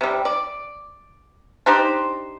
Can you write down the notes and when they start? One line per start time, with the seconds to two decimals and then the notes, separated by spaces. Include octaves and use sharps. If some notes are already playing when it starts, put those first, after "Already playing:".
0.01 C3 G3
0.25 D5
1.66 D4 D#4 G4 C5